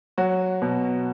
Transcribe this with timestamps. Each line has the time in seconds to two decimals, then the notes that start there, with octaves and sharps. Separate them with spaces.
0.18 F#3 F#4
0.62 B2